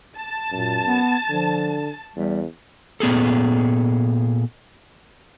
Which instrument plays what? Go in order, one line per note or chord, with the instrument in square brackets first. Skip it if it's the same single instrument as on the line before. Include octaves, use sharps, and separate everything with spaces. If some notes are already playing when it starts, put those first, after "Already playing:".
[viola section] A5
[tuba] F#2 [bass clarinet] A#2
[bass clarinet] B3
[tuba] D3 [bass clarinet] F3
[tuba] E2 [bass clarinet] G3
[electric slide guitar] A#2 B3 G#4 A4